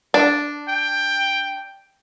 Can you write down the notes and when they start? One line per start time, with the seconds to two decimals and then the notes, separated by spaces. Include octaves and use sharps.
0.14 D4
0.69 G5